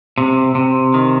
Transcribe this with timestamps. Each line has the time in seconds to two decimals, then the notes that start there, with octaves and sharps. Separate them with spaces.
0.18 C3
0.55 C3
0.94 D#3